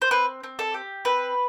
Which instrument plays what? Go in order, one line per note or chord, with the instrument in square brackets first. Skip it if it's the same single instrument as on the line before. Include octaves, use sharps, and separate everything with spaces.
[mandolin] C5
C4 B4
C4
A4
G4
C4 B4